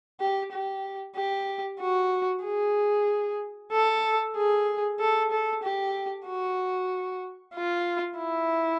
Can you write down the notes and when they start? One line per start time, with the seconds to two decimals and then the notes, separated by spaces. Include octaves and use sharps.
0.20 G4
0.52 G4
1.16 G4
1.81 F#4
2.44 G#4
3.72 A4
4.36 G#4
5.00 A4
5.31 A4
5.64 G4
6.27 F#4
7.55 F4
8.18 E4